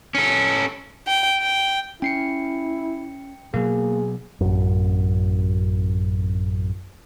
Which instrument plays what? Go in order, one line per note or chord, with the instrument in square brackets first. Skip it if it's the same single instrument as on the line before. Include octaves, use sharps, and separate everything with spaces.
[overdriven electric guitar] C#4 A4
[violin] G5
G5
[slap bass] C#4 [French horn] E4 [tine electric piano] G5 C7 C#7
[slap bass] B2 F#3 [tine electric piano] A#3 [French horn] G#4
[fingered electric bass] A1 F#2